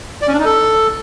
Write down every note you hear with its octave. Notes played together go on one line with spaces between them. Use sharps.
D5
C#4
D4
D#4
A4